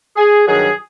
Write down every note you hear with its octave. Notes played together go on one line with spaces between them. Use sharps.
G#4
G2 D#3 F#3 G#4